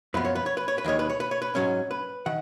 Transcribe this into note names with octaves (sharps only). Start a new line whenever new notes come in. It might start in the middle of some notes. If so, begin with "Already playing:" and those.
F#2 F3 B3 B4
C#5
B4
C#5
B4
C#5
B4
D#2 D#3 G#3 C#5
B4
C#5
B4
C#5
B4
G#2 F#3 C#4 C#5
B4
D#3 F#5